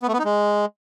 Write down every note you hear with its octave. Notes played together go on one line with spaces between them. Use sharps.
B3
A3
B3
D#4
G#3